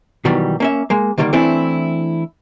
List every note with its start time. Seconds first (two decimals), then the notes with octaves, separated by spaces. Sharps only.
0.25 B2 D#3 E3 F#3 G3
0.60 A#3 C#4 E5
0.90 G#3 A#3
1.18 D3 D#3 G3 A3 A#3
1.33 E3 A3 C4 D4 E4